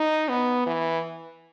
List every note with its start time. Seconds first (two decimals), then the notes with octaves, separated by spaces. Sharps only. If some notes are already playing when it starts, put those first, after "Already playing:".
Already playing: D#4
0.29 B3
0.67 E3